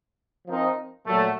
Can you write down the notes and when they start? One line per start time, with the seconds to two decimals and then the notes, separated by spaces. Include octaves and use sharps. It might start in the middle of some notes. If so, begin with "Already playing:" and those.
0.47 F3 C4 D#4 A#4
1.06 A#2 F#3 A3